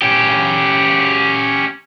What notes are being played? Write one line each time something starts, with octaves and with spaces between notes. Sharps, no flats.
C#4 G4